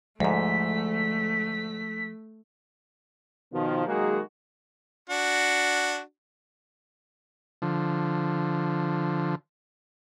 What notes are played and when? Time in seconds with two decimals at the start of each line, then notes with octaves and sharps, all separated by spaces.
0.20 D2 G#2 F3 G#3 A3 B6
3.53 B2 D#3 F3
3.87 D#3 F#3 G#3 A#3 F#4 G#4
5.10 D4 F#4
7.62 D3 F3